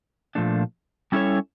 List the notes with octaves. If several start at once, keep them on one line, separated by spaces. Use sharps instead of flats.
A#2 F3 A3 D4
G3 C#4 E4 A4 C#5